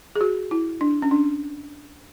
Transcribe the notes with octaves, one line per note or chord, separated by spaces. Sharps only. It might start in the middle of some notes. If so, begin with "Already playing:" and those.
G#4
F#4
E4
D4
C#4
D4